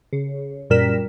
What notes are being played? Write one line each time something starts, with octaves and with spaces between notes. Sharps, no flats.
C#3
F#2 A#2 G3 A#4 B6 E7